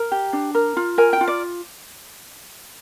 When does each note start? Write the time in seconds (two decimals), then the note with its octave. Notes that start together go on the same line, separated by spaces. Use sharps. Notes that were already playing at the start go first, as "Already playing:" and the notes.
Already playing: A#4 A#5
0.12 G4
0.33 D4
0.55 A#4
0.77 F4
0.98 A#4 G#5
1.13 G5
1.21 F4
1.28 D5